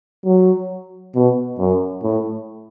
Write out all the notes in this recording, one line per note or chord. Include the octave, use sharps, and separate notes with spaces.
F#3
B2
F#2
A2